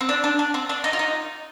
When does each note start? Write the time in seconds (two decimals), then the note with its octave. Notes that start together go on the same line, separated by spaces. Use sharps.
0.01 C4
0.09 D4
0.24 D4
0.39 D4
0.54 C4
0.69 D4
0.84 D#4
0.93 F4
0.99 D#4